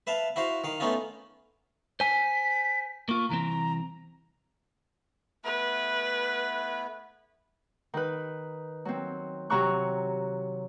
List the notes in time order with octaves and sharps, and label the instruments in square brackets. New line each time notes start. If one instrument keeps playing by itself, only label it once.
[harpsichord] B4 E5 F5 A5
E4 F#4 C5 F5
D#3 F5
A3 B3 C#4 D#4 F4
[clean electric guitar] C5 G#5 [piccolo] B6
[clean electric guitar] A#3 F4 [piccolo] C#6
[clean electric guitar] C2 E3 C4 [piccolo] A#5
[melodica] A3 B3 E4 [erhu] B4
[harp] D#3 B4
F#3 C4
C3 F#3 A#5 C#6 F#6